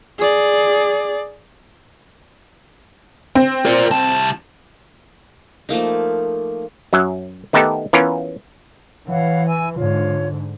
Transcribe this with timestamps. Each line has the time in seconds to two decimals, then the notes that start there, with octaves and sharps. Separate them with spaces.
0.19 G#4 D5
3.35 C4
3.66 A#4 D5
3.91 C2 A5
5.69 F3 A3 A#3 D#4
6.93 F#2 F#3 E5
7.53 D#3 A3 B3 D#4 G4 A4
7.93 E3 B3 C#4 F4 A#4
9.08 E3 C#5 F5 F#5
9.48 G#5 E6
9.77 G#2 D3 F4 C#5